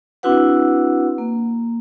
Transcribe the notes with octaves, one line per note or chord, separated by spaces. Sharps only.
C4 D4 E4 F#4 B4 F#5
A#3